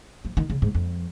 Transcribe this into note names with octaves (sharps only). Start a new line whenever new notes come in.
F3
D#3
C#3
G#2
F2